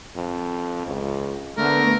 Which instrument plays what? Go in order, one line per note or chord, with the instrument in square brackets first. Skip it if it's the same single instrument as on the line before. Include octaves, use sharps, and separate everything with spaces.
[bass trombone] F2
C#2
[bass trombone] D3 [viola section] A3 B3 [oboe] A#4